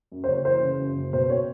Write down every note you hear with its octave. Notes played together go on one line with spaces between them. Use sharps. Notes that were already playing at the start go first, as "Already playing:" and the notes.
F#2
C5
F#1 C#5
E3 C5
C#3
F#2
F#1
B2 C5
C#5